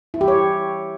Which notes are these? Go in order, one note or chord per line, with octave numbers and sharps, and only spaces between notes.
E4
G4
C#5